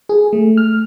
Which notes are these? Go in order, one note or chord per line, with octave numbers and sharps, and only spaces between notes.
G#4
A3
F6